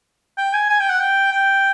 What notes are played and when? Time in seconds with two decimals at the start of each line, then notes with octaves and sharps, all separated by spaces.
0.38 G5
0.53 G#5
0.70 G#5
0.80 G5
0.90 F#5
1.00 G5
1.32 G5